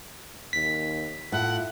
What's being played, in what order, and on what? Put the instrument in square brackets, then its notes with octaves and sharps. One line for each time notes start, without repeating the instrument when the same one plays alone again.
[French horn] D#2 [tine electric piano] B6
[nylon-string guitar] A2 [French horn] F4 [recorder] F#5